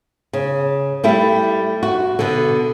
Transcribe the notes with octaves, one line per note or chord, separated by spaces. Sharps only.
C#3
G3 A3 E4
F#4
B2 D3